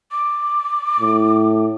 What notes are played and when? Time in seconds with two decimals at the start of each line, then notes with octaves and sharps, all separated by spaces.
0.11 D6
1.00 A2